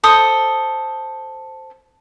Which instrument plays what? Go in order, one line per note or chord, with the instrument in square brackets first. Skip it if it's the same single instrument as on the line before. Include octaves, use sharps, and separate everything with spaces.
[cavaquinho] A4 C5 D#6